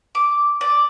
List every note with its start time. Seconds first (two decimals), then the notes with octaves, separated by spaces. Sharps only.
0.15 D6
0.61 D5